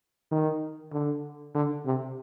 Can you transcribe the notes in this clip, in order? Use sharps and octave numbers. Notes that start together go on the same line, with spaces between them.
D#3
D3
D3
C3